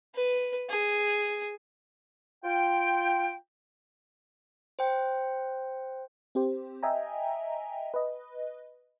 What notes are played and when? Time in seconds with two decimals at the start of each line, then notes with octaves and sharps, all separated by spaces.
0.14 B4
0.69 G#4
2.44 F4 G5
4.79 C5 G5
6.35 C4 G4 C5
6.83 D#5 E5 G5 G#5 A#5
7.94 B4 D#5